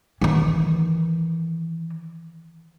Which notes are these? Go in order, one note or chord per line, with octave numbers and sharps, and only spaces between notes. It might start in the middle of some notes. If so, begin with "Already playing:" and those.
D#3 E3